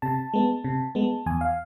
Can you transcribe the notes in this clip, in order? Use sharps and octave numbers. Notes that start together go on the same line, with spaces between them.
C3 A5
G#3 B3
C3
G#3 B3
E2 G#5
F5